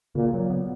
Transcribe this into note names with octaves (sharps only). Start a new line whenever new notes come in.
A#2 C#3
F#3
B3